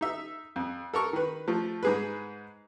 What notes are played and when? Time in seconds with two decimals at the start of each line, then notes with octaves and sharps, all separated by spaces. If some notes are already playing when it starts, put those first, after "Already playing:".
0.01 D#4 E5
0.56 F2
0.94 A4 A#4 C#6
1.13 D#3 B4
1.48 F3 A3
1.83 G#2 G#4 B4